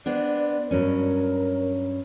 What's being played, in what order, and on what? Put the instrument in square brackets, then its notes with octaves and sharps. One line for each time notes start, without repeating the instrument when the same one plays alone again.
[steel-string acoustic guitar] B3 C4 D4 [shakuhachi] D5
[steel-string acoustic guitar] G2 F#3 C#4 [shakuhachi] A#4